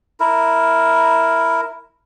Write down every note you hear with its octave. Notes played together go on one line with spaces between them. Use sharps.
E4 A#4